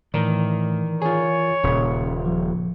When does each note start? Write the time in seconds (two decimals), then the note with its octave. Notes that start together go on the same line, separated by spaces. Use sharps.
0.14 A2 D#3 E3 A#4 D5
1.02 F4 G#4 C#5
1.64 D#1 A#2 C#3
2.25 F3